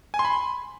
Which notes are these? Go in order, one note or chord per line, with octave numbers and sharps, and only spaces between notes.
G#5
C6
B5